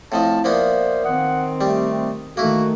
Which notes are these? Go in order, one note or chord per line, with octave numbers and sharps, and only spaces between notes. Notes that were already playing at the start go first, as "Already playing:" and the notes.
A2 F3 C4 E4 D#5 F5 A5
F3 A#3 B3 A#4 C5 D5 E5
D#3 C4 F#5 D#6
G3 A3
D#3 A3 A#3 E4 F#4